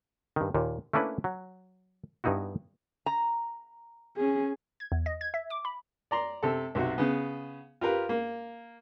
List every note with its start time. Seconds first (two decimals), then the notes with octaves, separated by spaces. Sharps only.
0.36 G2 D#3
0.54 D#2 A#2
0.93 A3 A#3 C#4 D4 E4 B4
1.24 F#3
2.24 G2 B3 D#4 E4 F#4
3.06 A#5
4.17 C#4 G#4
4.80 G#6
4.92 E2
5.06 D#5
5.21 G#6
5.34 E5
5.50 D6
5.65 B5
6.11 D5 A#5 C6
6.43 C3 A4
6.75 B1 C3 F#4
6.98 C#3 B3
7.81 F4 G4 A#4 B4
8.09 A#3